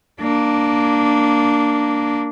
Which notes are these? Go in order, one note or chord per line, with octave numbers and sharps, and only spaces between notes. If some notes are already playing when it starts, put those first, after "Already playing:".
A#3 D4